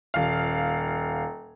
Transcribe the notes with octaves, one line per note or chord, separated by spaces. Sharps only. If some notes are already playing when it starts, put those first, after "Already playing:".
D#1 F5